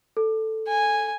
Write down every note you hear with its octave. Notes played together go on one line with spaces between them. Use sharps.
A4
G#5